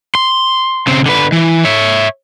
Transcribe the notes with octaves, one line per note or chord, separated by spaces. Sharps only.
C6
C#3 C4
D3 B4
E3
C#5 E5